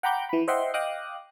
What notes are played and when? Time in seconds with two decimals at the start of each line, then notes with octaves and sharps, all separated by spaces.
0.03 F#5 G5 A#5 B5 D6 G6
0.29 E3 B5
0.48 C5 D#5 E5 F#5 G5 C6
0.74 D#5 F5 G5 D6 D#6 F#6